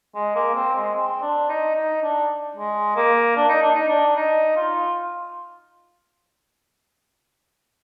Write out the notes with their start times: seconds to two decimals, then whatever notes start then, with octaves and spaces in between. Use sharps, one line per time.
0.15 G#3
0.35 A#3
0.55 C4
0.75 G#3
0.96 C4
1.22 D4
1.49 D#4
1.76 D#4
2.02 D4
2.56 G#3
2.96 A#3
3.37 D4
3.49 D#4
3.62 D4
3.75 D#4
3.88 D4
4.16 D#4
4.56 F4